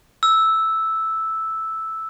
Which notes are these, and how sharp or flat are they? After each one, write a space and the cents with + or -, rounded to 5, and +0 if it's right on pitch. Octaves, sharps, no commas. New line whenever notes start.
E6 -5